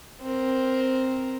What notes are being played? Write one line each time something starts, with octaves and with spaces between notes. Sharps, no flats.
C4 A#4